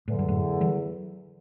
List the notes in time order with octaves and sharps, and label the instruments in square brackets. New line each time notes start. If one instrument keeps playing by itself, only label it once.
[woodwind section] E2 D3 F#3 [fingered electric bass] A2
[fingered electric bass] G2
F#2 A2
E3 G3